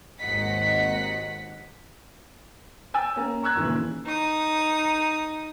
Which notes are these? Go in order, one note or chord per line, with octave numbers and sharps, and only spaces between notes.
G#1 D#2 G#2 D#5 F#5 B6
G5 G#5 E6 A6
A#3 C#4
A#5 C#6 E6 F#6 G#6
D#2 A#2 C#3 E3
D#4 D#6